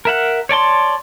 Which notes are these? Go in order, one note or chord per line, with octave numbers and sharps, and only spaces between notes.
A#4 E5 F#5
C#5 D5 A5 C6